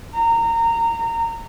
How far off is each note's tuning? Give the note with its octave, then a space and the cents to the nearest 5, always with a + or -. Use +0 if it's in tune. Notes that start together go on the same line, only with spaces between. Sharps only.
A#5 -20